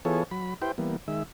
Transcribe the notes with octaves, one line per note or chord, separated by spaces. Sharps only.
E3 B3 F4 G#4 A4 C#5
F#3 B5
E4 G4 B4 C5 G5
E3 G3 A#3 B3
D#3 G#3 E5